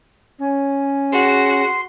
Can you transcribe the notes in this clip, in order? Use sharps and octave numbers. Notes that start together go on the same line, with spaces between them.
C#4
F#4 G#4 C6